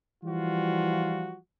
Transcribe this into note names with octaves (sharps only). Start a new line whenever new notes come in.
E3 F3 G3 F4 F#4